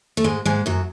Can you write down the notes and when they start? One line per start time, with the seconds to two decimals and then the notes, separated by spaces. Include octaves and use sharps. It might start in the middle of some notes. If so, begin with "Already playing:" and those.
0.17 A3
0.24 G#2 G#3
0.45 G#2 G#3
0.66 F#2 F#3